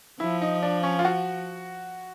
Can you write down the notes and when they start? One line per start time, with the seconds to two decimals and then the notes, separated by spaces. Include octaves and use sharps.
0.20 F3 E4
0.42 D#4
0.62 D4
0.83 C#4
0.99 F4
1.05 F#4